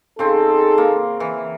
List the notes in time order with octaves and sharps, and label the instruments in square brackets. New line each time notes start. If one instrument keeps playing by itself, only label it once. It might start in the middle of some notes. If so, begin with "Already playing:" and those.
[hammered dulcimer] C#3 C4 [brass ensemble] D#4 G#4 A4
[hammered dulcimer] A#3
E3